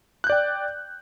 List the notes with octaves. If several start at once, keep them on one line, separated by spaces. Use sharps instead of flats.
D5 G5 F#6 G6